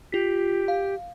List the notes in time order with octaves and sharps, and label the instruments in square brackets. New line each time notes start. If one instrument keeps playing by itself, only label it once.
[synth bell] F4 B6 [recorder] G4
[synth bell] F5